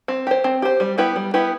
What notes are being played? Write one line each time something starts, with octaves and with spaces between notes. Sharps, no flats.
C4
G4 C5
C4
G4 C5
G3
B3 E4 G4 B4
G3
B3 E4 G4 B4